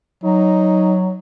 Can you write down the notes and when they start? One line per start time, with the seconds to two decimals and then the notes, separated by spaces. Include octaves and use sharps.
0.24 F#3 D#4